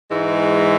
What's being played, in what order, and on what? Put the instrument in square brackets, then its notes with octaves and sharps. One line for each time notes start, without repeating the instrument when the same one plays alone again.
[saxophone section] G#2 E3 G#3